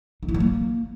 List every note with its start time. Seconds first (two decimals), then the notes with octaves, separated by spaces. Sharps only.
0.23 D#4
0.28 E4
0.34 G3
0.40 A#3